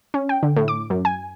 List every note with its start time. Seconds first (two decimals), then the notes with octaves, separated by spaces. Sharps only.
0.14 C#4
0.29 G5
0.43 D3
0.57 A2
0.68 D6
0.90 F#2
1.05 G#5